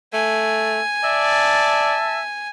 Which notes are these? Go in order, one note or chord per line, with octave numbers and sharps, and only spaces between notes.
A3 G#5
D5 E5 A5